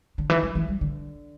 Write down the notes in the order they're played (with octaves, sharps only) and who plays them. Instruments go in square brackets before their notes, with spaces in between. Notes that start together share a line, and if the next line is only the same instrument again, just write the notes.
[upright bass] D3
E3
E3
E3
G3
D3